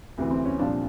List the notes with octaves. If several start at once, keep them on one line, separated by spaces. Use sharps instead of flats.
D2 C3 E3
C4
C#4
C2 A#2 F3 D4